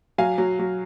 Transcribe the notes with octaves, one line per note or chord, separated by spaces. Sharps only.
F#3 F5 G#5
F#3
F#3